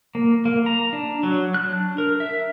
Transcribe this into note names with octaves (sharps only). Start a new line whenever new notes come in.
A#3
A#3
A#5
D4
F#3
F#6
D4
A#4
E5